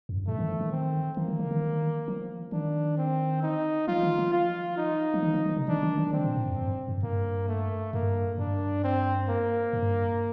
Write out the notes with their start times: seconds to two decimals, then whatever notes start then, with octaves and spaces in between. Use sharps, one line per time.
0.09 F2
0.16 G2
0.27 A2 A3
0.39 D#3
0.49 F3
0.61 D#3
0.72 C4
1.17 D#3 A#3
1.28 D#3
1.39 D3
1.51 D#3
2.08 F3
2.52 D#3 D4
2.98 C4
3.42 D#4
3.88 F3 F4
4.03 D#3
4.18 F3
4.33 F4
4.78 D#4
5.14 F3
5.23 D#3
5.34 F3
5.46 D#3
5.57 C3
5.68 D#3 D4
5.83 D#3
5.98 D#3
6.13 D3 C4
6.24 A#2
6.36 A2
6.47 F2
6.58 G2
6.88 G2
7.03 G2 A#3
7.48 A3
7.93 G2 A#3
8.38 G2 D4
8.84 C4
9.29 A#3
9.73 G2